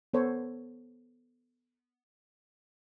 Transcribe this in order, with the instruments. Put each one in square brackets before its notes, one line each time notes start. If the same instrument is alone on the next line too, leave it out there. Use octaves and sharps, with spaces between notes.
[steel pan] B3 A4 C5 C#5